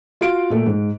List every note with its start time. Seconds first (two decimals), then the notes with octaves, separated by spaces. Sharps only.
0.21 F4 F#4 F5 D7
0.50 A#2 A3 A4
0.67 G#2